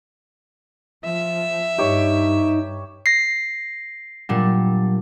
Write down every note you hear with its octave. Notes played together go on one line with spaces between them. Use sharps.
F3 E5
G2 D#4 G4 C#5
A#6 C7
A#2 F#3 G3 D4